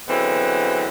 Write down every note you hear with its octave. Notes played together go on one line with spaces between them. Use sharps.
D3 E3 F#3 G#3 B3 C4